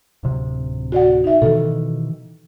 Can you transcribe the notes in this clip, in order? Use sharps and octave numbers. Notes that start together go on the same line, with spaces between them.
D1 C3
F#4 D5 F#5
D#4 E5
B2 D#3 E3 A4